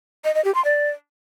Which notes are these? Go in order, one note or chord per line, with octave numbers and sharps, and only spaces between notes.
D#5
D#5
G4
C6
D5